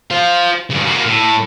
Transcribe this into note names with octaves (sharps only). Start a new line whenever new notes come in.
C5 F5
G2 C#3
A#3 F#4
A2